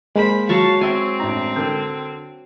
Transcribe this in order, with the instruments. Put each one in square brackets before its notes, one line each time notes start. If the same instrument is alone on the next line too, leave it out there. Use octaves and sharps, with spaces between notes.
[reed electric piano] G#3 [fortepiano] A#3 A#4 C5 [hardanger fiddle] B5
[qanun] F#3 A5 C#6 [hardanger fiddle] F5
[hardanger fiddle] C4 [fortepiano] C#5 E5 [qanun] G#5
[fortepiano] A1 D4 A#5
D3 A#4 G5